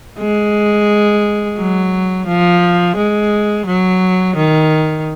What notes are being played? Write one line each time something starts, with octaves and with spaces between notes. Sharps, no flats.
G#3
F#3
F3
G#3
F#3
D#3